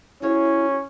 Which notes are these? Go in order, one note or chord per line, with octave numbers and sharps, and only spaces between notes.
C#4 E4 F#4 G#4 C#5